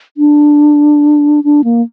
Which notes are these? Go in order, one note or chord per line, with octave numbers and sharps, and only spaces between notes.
D4
D4
A#3